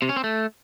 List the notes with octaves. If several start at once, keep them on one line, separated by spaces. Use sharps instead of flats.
C3
C#4
C4
A3